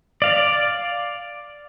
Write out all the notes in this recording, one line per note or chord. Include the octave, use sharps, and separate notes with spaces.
D5 F5